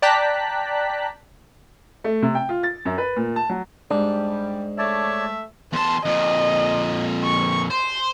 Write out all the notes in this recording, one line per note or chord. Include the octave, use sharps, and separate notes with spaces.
D5 G5 A5 A#5 F#6 B6
A3
C3
G5
F4
A6
F#2
B4
A#2
A5
F#3
G#2 G3 D4
A3 C#5 D5 E5 A5
E2 A5 C6
F2 A#2 D#5
C#6
C5 C6